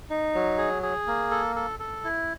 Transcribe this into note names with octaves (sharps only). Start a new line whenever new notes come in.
D#4
F#3
G#4
G#4
A#3
A4
A4
A4
E4